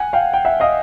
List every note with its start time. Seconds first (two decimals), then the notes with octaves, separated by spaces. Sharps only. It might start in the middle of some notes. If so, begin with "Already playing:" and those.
Already playing: F#5 G#5
0.13 F5 G5
0.33 G5
0.45 E5 F#5
0.60 D#5 F5